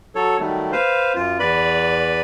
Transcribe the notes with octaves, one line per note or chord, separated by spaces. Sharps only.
F#3 A4 C#5
D#3 F#3 G3 A3
B4 C5 F5
F#2 F4
E2 B4 D5 B5